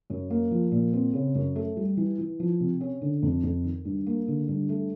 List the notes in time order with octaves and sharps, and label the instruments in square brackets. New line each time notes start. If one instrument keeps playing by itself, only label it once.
[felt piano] F#2
A#3
F3
A#2
C4
C#3
F#2
A3
G3
E3
E3
F3
C3
C#4
D3
F2
F2
D#3
G2
A#3
D3
G2
A3